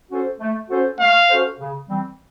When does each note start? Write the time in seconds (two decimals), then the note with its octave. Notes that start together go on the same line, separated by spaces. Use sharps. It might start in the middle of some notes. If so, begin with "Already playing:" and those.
0.11 C#4 F#4 A4 C5
0.41 A3
0.70 C#4 F#4 A4 C5
0.99 A3 F5
1.30 C#4 F#4 A4 C5
1.60 C#3
1.89 E3 G3 C4